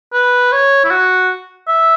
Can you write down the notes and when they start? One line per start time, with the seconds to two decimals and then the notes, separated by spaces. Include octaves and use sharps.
0.13 B4
0.52 C#5
0.85 E4
0.91 F#4
1.68 E5